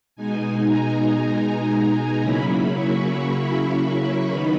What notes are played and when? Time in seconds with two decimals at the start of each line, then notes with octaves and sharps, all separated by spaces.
0.16 B2 G#3 D#4 G#5
0.68 A#5
2.22 C#3 F#3 A#3 C#4 E4 B5
2.73 C#6
4.28 D#3 F#3 B3 D#4 B5